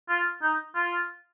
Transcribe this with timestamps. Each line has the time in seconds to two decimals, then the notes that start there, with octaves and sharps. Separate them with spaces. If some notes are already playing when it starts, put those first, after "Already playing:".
0.09 F4
0.42 D#4
0.75 F4